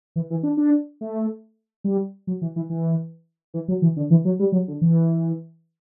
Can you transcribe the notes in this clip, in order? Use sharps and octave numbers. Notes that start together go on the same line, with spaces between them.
E3
E3
D4
D4
A3
G3
F#3
E3
E3
E3
E3
F#3
E3
D3
E3
F#3
G3
F#3
D3
E3